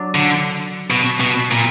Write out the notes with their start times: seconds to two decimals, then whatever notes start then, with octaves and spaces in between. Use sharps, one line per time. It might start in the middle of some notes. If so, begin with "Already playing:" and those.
Already playing: F#3 D4
0.15 D3
0.91 B2
1.20 B2
1.51 A#2